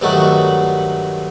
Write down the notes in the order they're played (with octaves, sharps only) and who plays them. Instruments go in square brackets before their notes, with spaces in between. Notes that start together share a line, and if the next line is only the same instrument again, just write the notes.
[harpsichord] G2 D#3 F#3 A3 F#5